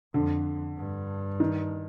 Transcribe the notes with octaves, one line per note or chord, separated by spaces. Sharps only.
F2 D3
G2
D#3